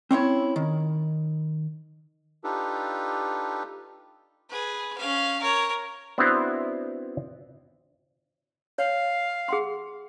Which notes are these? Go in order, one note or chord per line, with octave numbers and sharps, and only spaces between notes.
C4 C#4 E4 C#5
D#3
D4 D#4 F4 G4 A4 B4
G#4 B4
C#4 F5
A#4 C#5
B3 C4 D4 E4 F#4 C5
C#5 F5
G#4 F#5 C6